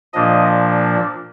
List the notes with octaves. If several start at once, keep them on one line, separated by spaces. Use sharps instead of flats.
A#2 F3 A#3 D4 D#5